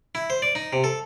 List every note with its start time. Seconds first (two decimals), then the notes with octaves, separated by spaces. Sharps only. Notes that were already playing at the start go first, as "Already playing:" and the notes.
0.15 E4
0.30 C5
0.42 D5
0.55 D#4
0.73 C3
0.84 A4